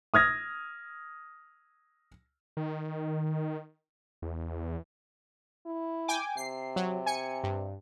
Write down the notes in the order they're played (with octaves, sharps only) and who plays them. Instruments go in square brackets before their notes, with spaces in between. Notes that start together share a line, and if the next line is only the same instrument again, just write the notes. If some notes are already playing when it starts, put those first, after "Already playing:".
[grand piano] D#6 F6 G#6 A#6
[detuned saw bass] D#3
E2
[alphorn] E4
[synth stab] G5 G#5 D6
[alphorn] C3 [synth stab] C7
[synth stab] F#3
G#5 C#7
G2